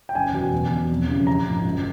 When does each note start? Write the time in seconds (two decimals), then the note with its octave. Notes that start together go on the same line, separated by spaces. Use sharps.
0.09 G5
0.15 F#1 G#5
0.33 E2 B2 F#3
0.53 E1
0.72 E2 B2
0.89 F2
1.08 C#3 E3 G3
1.27 A#1 A#5
1.46 G#2 F3
1.64 F#1